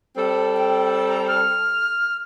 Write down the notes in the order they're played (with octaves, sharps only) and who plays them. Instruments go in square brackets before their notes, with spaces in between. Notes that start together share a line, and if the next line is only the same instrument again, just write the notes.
[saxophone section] G3 C4 A4
[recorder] G5
A#5
F6